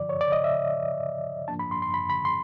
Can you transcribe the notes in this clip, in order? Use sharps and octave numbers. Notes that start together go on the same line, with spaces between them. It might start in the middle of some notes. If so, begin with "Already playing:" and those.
Already playing: G2 D3 F3 D5
C#5
D5
D#5
E5
G#2 F3 A#3 D4 A5
B5
C6
C6
B5
B5
C6